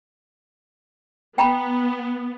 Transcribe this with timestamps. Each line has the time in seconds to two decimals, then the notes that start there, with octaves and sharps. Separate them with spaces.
1.38 B3 G5 A#5 B5